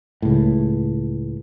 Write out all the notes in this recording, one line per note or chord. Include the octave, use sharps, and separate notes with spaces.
C#2 A2